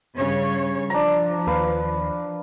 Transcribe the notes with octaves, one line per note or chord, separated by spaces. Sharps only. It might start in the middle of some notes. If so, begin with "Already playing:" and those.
G2 C#3 C#5
F3 D4 A#5
D#2 B4 F5